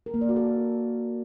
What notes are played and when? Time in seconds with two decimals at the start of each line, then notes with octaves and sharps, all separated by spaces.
0.06 A#4
0.14 A#3
0.21 D5
0.29 F#4
0.36 A4